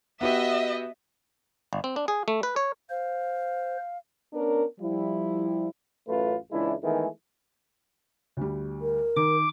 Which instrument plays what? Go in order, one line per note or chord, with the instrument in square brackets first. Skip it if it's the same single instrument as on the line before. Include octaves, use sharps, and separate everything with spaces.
[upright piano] B3 F#4 G4 [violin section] D#5 E5
[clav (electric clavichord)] G1
C4
D4
G#4
A3
B4
C#5
[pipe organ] C5 [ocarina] F5
[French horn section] B3 C#4 D4 A#4
F3 G3 E4
[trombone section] A1 F#2 A3 F4 B4
C#2 E3 G#3 D4 E4
D#3 E3 G#3 A3 B3 G#4
[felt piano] D2 G3
[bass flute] A#4
[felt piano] D#3 [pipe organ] D6